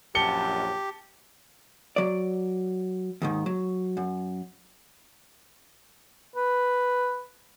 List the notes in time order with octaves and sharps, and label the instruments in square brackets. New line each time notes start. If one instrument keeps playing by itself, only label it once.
[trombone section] A#1 F#2 [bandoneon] G4 [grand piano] A5 C#7 G7
[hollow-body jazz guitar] F#3 D5
D#2 G#2 D#3
F#3
F#2
[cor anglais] B4